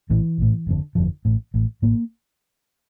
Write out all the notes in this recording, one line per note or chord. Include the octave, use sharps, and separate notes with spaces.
A#1 A2 E3
A#1 A2
G1 F2 D3
G1 F2 D3 F3
A1 A2
A1 A2
A1 A2 A#3